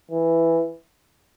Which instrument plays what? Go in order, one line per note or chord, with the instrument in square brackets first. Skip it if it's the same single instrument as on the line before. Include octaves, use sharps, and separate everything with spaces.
[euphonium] E3